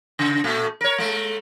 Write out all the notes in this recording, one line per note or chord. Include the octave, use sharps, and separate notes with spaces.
C#3
A#2 A3
A#4 C#5
G#3 A3